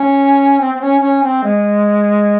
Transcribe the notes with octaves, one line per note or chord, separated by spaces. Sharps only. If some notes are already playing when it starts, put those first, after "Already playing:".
Already playing: C#4
C4
C4
C#4
C#4
C4
G#3